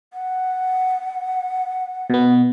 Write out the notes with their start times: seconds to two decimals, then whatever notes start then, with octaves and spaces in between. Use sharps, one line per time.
0.13 F#5
2.10 B2 B3